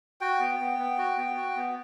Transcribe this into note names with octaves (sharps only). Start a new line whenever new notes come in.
F#4 G5
B3
B3
B3
F#4
B3
F#4
B3